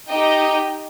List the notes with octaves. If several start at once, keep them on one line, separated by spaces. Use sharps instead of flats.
D#4 G4 D#5 G5